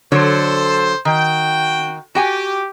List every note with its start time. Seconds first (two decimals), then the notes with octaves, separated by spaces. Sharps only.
0.12 D3 F#3 A4 C5 C#5
1.05 D#3 F#4 G5
2.15 F#4 G4 G5 G#5